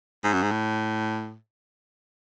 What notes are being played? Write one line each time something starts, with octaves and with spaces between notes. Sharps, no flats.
G#2
F#2
G#2
A2